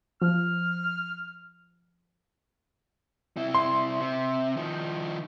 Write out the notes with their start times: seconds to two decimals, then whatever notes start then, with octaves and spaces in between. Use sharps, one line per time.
0.22 F3 F6
3.37 C3 E4
3.55 C6
4.01 C3
4.57 D#3 F3